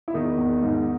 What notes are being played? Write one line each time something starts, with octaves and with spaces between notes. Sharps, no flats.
E4
E2 D#3 D#4
E2
G#2